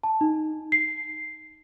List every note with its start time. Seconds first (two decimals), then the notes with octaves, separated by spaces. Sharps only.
0.03 A5
0.21 D#4
0.72 C7